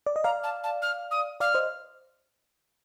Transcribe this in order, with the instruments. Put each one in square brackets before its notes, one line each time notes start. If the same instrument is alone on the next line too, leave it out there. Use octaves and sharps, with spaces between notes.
[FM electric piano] D5
D#5
[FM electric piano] D5 F5 [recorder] A#5
[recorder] A5
A5
F6
D#6
[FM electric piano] D5 F5 [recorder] F6
[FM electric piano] C5 D#5